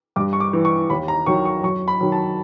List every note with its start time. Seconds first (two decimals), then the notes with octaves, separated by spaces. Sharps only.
0.16 G2 D6
0.33 C#6
0.40 D6
0.53 E3
0.65 C#6
0.90 D#2 B5
1.08 A#5
1.26 D#3 F#3 C#6
1.45 C#6
1.64 F#2 C#6
1.88 B5
2.01 D#3 F#3
2.12 A5